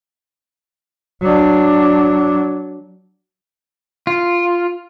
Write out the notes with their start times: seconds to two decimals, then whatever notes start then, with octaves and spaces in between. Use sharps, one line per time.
1.22 F#3 D4
4.07 F4